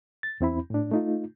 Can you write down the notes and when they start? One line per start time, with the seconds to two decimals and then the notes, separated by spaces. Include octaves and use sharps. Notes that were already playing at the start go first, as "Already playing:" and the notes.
0.23 A6
0.41 E2 C4 E4 B5
0.70 A2 D4
0.91 A3 D#4 F4